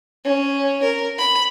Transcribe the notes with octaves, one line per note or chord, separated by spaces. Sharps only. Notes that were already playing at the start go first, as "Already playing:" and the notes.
C#4
A#4
B5